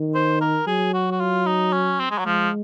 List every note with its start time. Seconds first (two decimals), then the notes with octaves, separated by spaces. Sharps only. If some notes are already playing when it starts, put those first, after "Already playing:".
Already playing: D#3
0.15 C5
0.41 A#4
0.67 F#3 G#4
0.94 F#4
1.11 F#4
1.20 F4
1.46 D#4
1.73 C#4
2.00 C4
2.11 G#3
2.18 F#3
2.26 F3 G#3